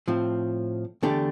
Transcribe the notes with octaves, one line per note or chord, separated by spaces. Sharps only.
A2 F3 C4
E2 D3 A3 D4 G4